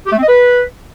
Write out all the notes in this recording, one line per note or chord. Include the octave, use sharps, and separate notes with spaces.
G4
A3
C4
D#5
B4